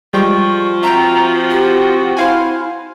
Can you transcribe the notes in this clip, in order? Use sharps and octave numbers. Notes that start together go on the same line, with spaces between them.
F3 G3 G#3 G5 C#6
C4 F#4 E5 G5 A#5
G4
E4 C5 F5 G#5